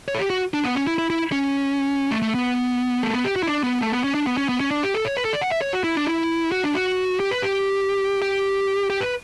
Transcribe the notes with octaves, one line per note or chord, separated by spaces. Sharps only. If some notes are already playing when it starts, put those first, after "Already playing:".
C#5
A4
G4
F#4
D4
B3
C#4
E4
E4
E4
C#4
A3
A3
B3
A3
B3
G4
F#4
E4
D4
B3
A3
B3
C#4
D4
B3
C#4
B3
C#4
D4
G4
A4
C#5
B4
A4
D5
F#5
E5
C#5
F#4
E4
D4
E4
F#4
D4
F#4
G4
B4
G4
G4
G4
B4